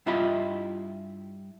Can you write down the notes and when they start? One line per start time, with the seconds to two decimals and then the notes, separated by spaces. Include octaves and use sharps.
0.06 G2 E4 F4 G4 D#5 B5